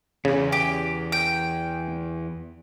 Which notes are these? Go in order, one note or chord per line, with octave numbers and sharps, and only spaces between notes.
E2 C#3
G4
G5